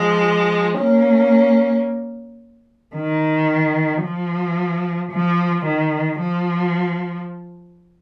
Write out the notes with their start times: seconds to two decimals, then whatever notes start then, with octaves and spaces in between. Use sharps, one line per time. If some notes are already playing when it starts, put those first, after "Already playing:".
Already playing: F3 G#3
0.78 A#3 C#4
2.96 D#3
4.03 F3
5.12 F3
5.65 D#3
6.19 F3